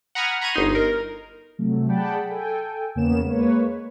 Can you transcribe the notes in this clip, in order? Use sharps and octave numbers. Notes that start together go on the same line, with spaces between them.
F#5 A#5 B5 D#6 F6 G#6
A#5 B5 C#6 G#6 D#7
G1 D#4 C6
A#4
C3 F#3 A3
G#4 D5 F#5 G5 A5 B5
A4 G5 G#5
E2 C#3 A#3 B3 C#5 E7
G#3 A#3 B4 C#5